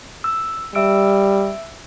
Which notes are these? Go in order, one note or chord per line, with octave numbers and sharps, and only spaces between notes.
E6
G3 E5 E6 D7